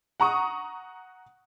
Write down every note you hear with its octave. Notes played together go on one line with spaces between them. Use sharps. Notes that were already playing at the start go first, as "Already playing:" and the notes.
F#5 A#5 C#6 D#6